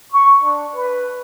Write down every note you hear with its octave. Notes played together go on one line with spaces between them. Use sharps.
C#6
D4
B4